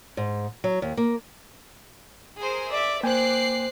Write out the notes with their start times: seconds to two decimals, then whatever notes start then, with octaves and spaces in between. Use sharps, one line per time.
0.17 G#2
0.64 F#3
0.82 D#2
0.97 A#3
2.39 G#4 A#4 C5
2.71 D5 E5
3.03 A#3 C5 G5 G#5 D6 F#6 C7